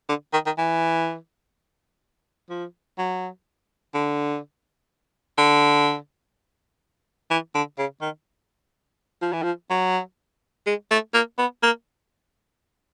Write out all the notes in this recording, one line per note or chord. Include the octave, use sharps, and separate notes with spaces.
D3
D#3
D#3
E3
F3
F#3
D3
D3
E3
D3
C#3
D#3
F3
E3
F3
F#3
G#3
A3
A#3
B3
A#3